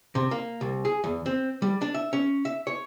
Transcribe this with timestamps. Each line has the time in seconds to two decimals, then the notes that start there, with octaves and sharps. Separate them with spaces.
0.15 C3
0.31 A#3
0.61 C2
0.85 G#4
1.04 E2
1.26 C4
1.62 G3
1.82 D4
1.94 E5
2.13 C#4
2.45 E5
2.67 C#5